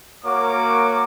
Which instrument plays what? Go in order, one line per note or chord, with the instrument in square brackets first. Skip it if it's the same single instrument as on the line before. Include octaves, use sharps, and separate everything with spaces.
[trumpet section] A#3 F#4 A#4 C#5 D6